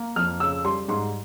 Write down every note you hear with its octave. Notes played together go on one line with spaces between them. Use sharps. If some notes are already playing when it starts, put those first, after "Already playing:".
Already playing: A#3
F2 F6
C#3 E6
G3 C6
G#2 C6